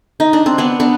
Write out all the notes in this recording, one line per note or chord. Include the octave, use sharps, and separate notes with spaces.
D#4
D4
C4
B3 D4
B3 D4